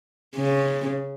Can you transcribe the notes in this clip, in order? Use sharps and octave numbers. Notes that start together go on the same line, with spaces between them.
C#3